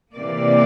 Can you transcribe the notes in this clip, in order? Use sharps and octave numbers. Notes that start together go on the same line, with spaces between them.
C3 E3 A#3 D5